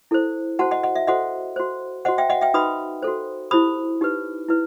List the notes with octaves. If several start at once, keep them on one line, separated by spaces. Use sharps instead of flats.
E4 A4 C5
F#4 C5 F#5 A5
D#5 F#5
D#5 F#5
E5
F#4 A4 C5 D#5 F#5
F#4 C5
F#4 C5 D#5 F#5
E5 G5
D#5 F#5
E5 G5
D#4 F#4 B4 B5 D#6
F#4 A4 C5
E4 G4 C5 B5 D#6
D#4 G4 B4
E4 B4